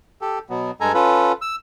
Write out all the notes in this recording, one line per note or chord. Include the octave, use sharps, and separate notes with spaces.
G4 A4
B2 F#3 B3
G2 G#3 A4 G#5 A#5
C#4 F4 A4 B4
E6